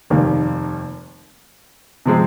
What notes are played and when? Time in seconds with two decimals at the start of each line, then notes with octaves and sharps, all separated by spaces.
0.10 F1 D#2 D#3 G3 A#3
2.06 C3 F3 G#3 C4